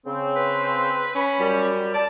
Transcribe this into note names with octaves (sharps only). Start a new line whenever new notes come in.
C#3 C4
B4
C#4 B5
F#2 G3
D5 A5